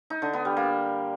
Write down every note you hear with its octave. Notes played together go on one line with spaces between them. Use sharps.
D#4
D3
B3
G3
A#3